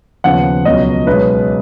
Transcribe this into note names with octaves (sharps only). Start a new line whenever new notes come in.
D#2 C#3 F3 B3 F#5
C#2 B2 F#3 C#4 F4 D#5
B1 B2 G#3 C#4 B4